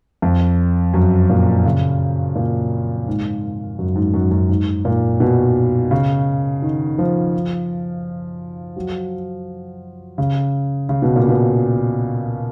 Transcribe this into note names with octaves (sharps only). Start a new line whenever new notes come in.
F2
F#2
A#2
C#3
A#2
G#2
F#2
G#2
F#2
F#2
G#2
A#2
B2
C#3
D#3
F3
F#3
C#3
C#3
B2
A#2
B2